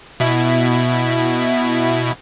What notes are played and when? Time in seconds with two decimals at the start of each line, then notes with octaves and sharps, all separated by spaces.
0.20 B2 E4